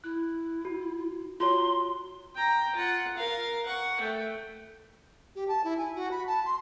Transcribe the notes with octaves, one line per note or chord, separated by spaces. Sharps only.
E4 F#6
F#4
F4 F#4 C#5 C6
G5 A#5
F4 F#5
A#4 F5
F#5 C#6
A3 G5
G4
A5
E4
G#5
F#4
B5
A5
C6